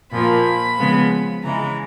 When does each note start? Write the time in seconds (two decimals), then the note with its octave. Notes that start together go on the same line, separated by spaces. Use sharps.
0.12 A#2 F3 A#3 B5
0.78 C#3 F3 G#3 B3
1.43 C#3 E3 G#3 A#5